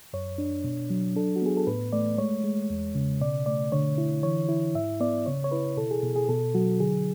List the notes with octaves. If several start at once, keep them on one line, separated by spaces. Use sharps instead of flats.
F#2 C#5
D4
B2
F#3
D4 A4
F#4
B3 G#4
A4
A2 B4
A3 D5
G#3 C#5
G#3
E2
C#3
B2 D5
A3 D5
D3 C#5
E4
E3 C#5
E4
G#2 E5
B3 D5
C#3 C#5
C#5
E4 B4
B2 A4
G#4
B2
G#4
B2 A4
F#3 F#4
D3 G#4